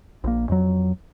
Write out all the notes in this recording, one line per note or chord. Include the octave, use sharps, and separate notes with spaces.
A#1 A#3
F2 F#3